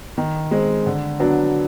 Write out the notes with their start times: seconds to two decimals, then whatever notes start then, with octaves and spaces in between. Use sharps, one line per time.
0.18 D#3
0.51 G#3 C4
0.86 D3
1.20 F#3 B3 D4